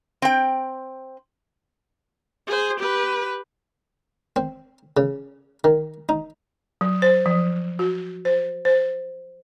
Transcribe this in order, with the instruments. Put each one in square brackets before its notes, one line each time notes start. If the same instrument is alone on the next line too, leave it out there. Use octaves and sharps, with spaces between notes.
[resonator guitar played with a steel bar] C4 G5
[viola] G#4 C5
G4 B4
[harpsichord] C4
C#3
D#3
D#4
[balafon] F#3
C5
F3
F#4
C5
C5